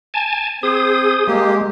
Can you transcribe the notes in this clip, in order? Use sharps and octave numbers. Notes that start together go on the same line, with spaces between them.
G#5 A5
C4 G#4 D#6
G#3 A#3 G4